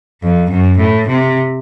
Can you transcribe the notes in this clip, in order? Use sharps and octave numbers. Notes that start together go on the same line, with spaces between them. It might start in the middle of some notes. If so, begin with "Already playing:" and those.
F2
F#2
A2
C3